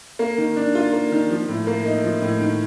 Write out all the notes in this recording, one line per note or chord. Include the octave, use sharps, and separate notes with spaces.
A#3
D#3
D4
F4
A#3
D#3
F3
A2
A#3
D#4
F3
A2
D#3